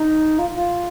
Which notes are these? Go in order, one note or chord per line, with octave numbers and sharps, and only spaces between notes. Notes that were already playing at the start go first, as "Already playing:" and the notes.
Already playing: D#4
F4
F4